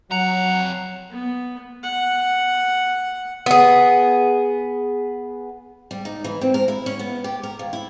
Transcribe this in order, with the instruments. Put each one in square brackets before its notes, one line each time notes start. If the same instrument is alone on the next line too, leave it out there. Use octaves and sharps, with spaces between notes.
[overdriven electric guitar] F2 A#5 [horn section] F#3 [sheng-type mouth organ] F#5
[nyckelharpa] B3
F#5
[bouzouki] B3 G#4
[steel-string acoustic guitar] G3
D#4
E3
C4
A#4
E4
C#4
B3
G4
A#4
D#2
E4